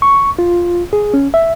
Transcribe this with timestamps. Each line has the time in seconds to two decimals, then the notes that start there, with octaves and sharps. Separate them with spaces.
0.02 C#6
0.39 F4
0.93 G#4
1.14 C#4
1.34 E5